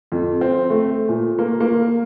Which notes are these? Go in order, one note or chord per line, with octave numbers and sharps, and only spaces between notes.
F2
C4
A3
A#2
A#3
A#3